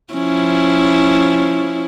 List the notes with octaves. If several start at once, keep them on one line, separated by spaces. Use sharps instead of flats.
F3 C#4 E4